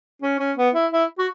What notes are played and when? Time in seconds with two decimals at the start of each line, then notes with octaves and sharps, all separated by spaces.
0.22 C#4
0.39 C#4
0.57 B3
0.75 E4
0.92 E4
1.19 F#4